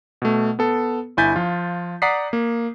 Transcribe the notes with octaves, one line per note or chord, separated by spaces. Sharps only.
B2 A3
B3 A4
G1 E4 G#5 G6 A6 B6
F3 F4
D5 F#5 A#5 D#6 B6 C7
A#3